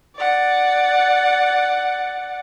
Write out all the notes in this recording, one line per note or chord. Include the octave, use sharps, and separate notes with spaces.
D5 F#5